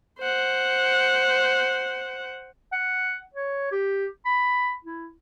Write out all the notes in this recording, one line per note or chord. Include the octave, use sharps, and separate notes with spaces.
C5 F#5
F#5
C#5
G4
B5
E4